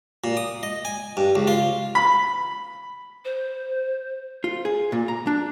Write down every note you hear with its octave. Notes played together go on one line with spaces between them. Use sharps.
A#2
D#6
D#5
G#5
G2
C#2
F4
B5
C5
F4
G#4
A#2
A#5
D4